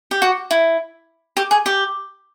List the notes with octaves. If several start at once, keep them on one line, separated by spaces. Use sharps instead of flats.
G4
F#4
E4
G4
G#4
G4